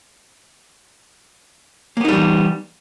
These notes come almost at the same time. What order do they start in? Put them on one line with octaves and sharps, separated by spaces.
A#3 B3 D#4 G3 E3